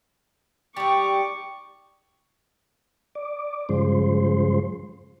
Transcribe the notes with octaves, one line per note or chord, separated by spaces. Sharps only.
G3 D#4 C#6 D6
D5
G2 C#3 F3 G#3 C5